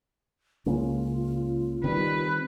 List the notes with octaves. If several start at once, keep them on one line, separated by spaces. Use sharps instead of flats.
C#2 C#3 A#3 C#4 F4
D#3 G3 C4 B4